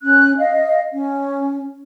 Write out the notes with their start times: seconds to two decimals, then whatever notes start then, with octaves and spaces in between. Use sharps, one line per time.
0.02 C#4 F#6
0.38 D#5 F5
0.92 C#4